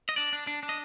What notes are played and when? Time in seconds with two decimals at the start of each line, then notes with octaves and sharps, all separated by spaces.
0.09 D#5
0.16 D4 D5
0.33 D4
0.47 D4
0.63 D4
0.69 D#5